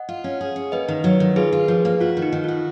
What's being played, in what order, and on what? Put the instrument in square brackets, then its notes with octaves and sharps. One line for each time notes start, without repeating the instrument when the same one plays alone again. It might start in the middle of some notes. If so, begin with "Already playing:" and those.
Already playing: [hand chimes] D#5 F#5
[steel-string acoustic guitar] F4
C#4
G#4
C#4
[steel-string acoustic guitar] A#3 [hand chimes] B4 D#5
[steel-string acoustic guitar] D#3
F#3
D#3
[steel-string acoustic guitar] F4 [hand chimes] G#4 B4
[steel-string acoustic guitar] F4
F3
A#3
[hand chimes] F4 [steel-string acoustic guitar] F#4
[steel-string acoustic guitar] D#3
[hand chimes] D#4
[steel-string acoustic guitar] D#3
[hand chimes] F4 [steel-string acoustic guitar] F#4